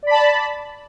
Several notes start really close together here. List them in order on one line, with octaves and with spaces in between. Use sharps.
D5 B5 A5